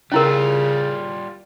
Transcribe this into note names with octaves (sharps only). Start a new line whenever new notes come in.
C#3 G3 C#4 E4 F4 A#4